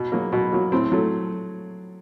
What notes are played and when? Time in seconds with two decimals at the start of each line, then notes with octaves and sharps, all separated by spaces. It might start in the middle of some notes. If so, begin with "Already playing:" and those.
Already playing: B2
0.12 F#3 A#3
0.32 B2
0.52 F#3 A#3
0.72 A2 C4
0.92 F#3 A3